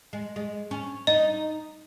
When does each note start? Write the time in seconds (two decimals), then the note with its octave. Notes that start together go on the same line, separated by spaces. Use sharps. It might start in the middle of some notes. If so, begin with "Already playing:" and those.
0.13 G#3
0.36 G#3
0.71 C#4
1.07 D#4 D#5